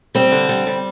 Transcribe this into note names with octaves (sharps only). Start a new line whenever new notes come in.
G3 C4
D3
G3
G3